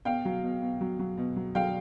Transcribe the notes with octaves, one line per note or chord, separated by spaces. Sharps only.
B2 F5 G5
F#3
B2
B2
F#3
F#3
B2
F#3
F#3 F5 G5